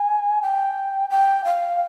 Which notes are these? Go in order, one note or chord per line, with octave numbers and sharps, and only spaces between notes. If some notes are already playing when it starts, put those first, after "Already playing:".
Already playing: G#5
G5
G5
F5